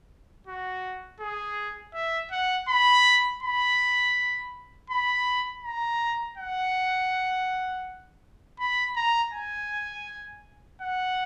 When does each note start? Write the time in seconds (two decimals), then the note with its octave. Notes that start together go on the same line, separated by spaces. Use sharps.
0.47 F#4
1.20 G#4
1.94 E5
2.31 F#5
2.68 B5
3.43 B5
4.90 B5
5.64 A#5
6.37 F#5
8.59 B5
8.96 A#5
9.33 G#5
10.81 F#5